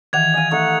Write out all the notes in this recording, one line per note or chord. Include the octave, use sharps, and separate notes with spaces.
D#3 E3 G4 F#5 G#5 G#6 F7
D#5 F5 G#5
A3 D#4 F#5